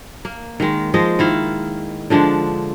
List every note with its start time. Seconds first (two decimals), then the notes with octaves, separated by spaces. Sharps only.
0.25 A#3
0.60 D#3 G#3
0.94 F3 G#3 C5 D#5
1.19 D#3 E4 F5
2.10 D3 F3 G#3 D4